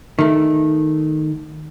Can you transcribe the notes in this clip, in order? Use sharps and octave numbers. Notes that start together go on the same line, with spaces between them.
D#3 A3